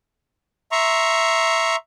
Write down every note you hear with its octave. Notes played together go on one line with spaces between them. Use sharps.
E5 A#5 C6 C#6